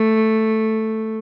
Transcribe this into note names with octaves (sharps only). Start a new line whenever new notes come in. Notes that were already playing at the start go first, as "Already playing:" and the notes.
Already playing: A3